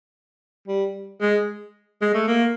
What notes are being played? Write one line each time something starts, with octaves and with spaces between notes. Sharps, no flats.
G3
G#3
G#3
A3
A#3